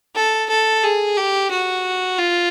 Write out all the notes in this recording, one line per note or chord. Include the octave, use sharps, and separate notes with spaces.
A4
A4
G#4
G4
F#4
F4